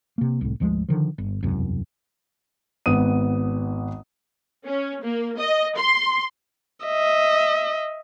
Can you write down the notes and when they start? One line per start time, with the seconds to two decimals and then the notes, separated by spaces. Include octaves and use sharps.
0.18 C3 A#3
0.41 C2 A2
0.60 G#1 D2 F3 G#3
0.89 D3 D#3 F3
1.18 G1
1.43 E1 C2 F#2
2.86 G#1 B3 D#6 D#7
4.67 C#4
5.04 A#3
5.40 D#5
5.76 C6
6.85 D#5 E5